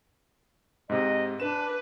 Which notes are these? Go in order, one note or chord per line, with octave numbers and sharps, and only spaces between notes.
G#2 C3 D#5
D4 B4 E7